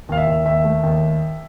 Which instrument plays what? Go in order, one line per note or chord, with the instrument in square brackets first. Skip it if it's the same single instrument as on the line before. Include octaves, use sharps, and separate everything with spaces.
[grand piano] D#2 [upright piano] F5
[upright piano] E5
[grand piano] D#2
[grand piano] D#2 [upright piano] E5
[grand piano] A3
D#2